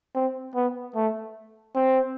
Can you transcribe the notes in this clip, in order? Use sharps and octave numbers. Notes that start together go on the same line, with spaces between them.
C4
B3
A3
C4